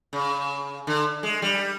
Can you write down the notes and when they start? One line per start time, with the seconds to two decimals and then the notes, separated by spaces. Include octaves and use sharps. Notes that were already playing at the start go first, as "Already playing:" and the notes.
0.13 C#3
0.87 D3
1.23 G#3
1.42 G3